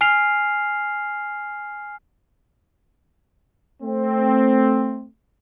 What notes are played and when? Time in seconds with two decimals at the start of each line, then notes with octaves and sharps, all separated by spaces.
0.01 G#5 F6 C7 F7
3.83 A3 C4